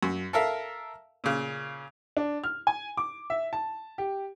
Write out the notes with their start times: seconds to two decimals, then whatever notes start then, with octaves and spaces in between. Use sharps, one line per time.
0.03 F#2
0.33 A4 A#4 E5 F5
1.24 A#2 C#3
2.17 D4
2.44 F6
2.67 G#5
2.97 D6
3.30 E5
3.53 A5
3.98 G4